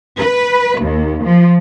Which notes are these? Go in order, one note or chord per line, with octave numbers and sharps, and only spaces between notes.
B4
D#2
F3